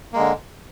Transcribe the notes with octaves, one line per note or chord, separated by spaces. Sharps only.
D3 G#3 A#3